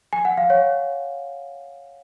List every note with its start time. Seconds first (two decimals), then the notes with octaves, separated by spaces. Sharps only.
0.13 G#5
0.25 F#5
0.37 F5
0.50 C#5